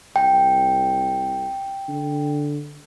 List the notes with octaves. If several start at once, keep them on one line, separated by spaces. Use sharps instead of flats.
C2 G5
D3